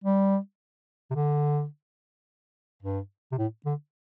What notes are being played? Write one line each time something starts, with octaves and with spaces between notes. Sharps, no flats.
G3
C3
D3
G2
C3
A2
D3